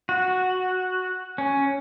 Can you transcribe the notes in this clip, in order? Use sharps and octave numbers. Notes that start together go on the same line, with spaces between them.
F#4
C#4